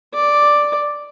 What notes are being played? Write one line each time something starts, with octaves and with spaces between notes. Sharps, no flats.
D5